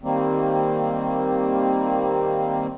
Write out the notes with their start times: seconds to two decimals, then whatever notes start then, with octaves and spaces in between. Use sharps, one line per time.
0.03 D#3 G3 A#3 C4